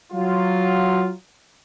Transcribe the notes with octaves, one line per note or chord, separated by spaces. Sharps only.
F#3 F4